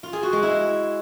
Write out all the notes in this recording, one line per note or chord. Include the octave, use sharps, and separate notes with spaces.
F4
G#4
F#4
G#3
E4